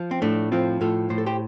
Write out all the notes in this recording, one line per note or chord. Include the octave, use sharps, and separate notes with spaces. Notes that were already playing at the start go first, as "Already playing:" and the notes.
Already playing: F3
C4
A2 A3 D4
F3 C4 F4
A2 F4 A4
A2 C5
A4
G4 C5